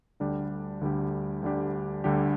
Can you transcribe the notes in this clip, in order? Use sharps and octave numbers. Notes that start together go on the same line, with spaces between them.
D2 D3 G3 D4 G4
D2 D3 G3 D4 G4
D2 D3 G3 D4 G4
D2 D3 G3 D4 G4